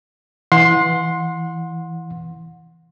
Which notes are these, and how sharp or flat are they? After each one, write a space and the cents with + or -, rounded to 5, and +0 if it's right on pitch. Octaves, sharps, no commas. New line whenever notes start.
E3 +0 F#5 -30 C6 +10